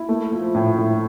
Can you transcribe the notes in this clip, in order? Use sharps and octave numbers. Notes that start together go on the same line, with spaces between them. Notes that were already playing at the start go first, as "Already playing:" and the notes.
Already playing: E4
A3
F3
A2
A2